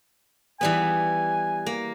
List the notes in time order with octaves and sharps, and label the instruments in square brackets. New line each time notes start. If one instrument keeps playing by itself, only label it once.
[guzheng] E3 G3 B3 [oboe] G#5
[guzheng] A#3